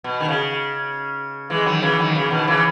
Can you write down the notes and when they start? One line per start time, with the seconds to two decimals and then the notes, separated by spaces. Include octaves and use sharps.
0.04 B2
0.20 D#3
0.28 C#3
1.50 E3 G#3
1.66 D#3 F#3
1.82 C#3 E3
1.99 D#3 F#3
2.15 C#3 E3
2.31 B2 D#3
2.47 C#3 E3